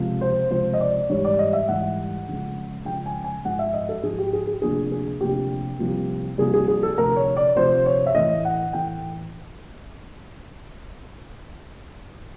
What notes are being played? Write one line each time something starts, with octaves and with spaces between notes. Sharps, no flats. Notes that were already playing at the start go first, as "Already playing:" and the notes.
Already playing: C#2 C3 F3
C5
C#2 C3 F3 C5
D#5
D5
G#2 E3 G3 C#5
D5
D#5
E5
G#2 E3 G3 F#5
C#3 F3 G#3
C#3 F3 G#3 G5
G#5
G#5
G#2 F3 G#3 F#5
E5
D#5
A4
G#2 F3 G#3 G#4
G4
G#4
G#4
D2 C3 F3 A#3 D4 G#4
G#4
D2 C3 F3 A#3 D4 G4
C2 C3 F3 A#3
C2 C3 F3 A#3 G#4
G#4
G#4
A4
D2 C3 F3 A#4
C#5
D5
D2 C3 F3 C5
C#5
E5
A2 E3 A3 D#5
F#5
A2 E3 A3 G5